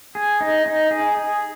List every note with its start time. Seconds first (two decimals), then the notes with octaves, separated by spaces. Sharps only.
0.15 G#4
0.41 D#4
0.66 D#4
0.91 G#4
1.17 G#4